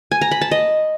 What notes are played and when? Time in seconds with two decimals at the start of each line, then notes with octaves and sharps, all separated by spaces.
0.11 G#5
0.21 A#5
0.31 B5
0.41 A5
0.51 D#5